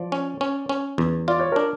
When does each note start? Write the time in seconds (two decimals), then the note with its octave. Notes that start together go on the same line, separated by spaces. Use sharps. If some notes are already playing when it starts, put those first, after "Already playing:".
Already playing: F3 D5
0.12 C#4
0.41 C#4
0.69 C#4
0.98 E2
1.28 F4 D5
1.40 C#5
1.52 D4 A#4